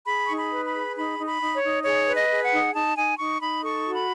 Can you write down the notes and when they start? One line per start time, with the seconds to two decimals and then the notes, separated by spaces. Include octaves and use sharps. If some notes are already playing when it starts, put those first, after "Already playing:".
0.06 G#4 B5
0.26 D#4 C#6
0.36 B5
0.51 B4
0.65 B5
0.73 G#4
0.95 D#4 B5
1.17 D#4
1.26 B5
1.40 D#4
1.54 C#5
1.62 D#4
1.84 G#4 C#5
2.06 B4
2.15 D#5
2.29 G#4
2.43 F#5
2.52 D#4
2.73 D#4 A5
2.96 D#4 G#5
3.18 D#4 C#6
3.41 D#4 B5
3.62 A4 C#6
3.85 F#4
3.93 B5